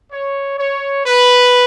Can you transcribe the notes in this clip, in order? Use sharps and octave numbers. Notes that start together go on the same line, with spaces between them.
C#5
C#5
B4